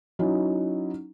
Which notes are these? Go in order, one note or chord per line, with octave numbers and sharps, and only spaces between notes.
F#3 C#4 D#4 E4